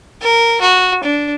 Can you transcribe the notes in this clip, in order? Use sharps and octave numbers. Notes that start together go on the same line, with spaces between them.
A#4
F#4
D4